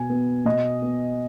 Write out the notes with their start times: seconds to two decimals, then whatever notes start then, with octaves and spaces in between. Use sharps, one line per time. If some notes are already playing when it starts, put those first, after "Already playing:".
Already playing: B2 G#5
0.10 B3
0.45 B2 D#5
0.82 B3